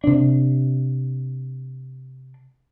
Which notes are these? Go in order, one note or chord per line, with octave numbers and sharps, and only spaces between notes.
C3 D4